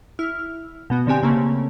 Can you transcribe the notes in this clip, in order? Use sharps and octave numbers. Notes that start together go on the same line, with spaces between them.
E4 F6
B2 B3 F#4
B2 D3 C4 G4 G#5
C#3 A3 A#3 C4 C#4